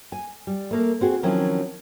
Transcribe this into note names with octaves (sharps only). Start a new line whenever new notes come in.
G#5
G3
A3 A#3 A#4
C4 F#4 G#4
D#3 F3 F#3 C4 C#4 E4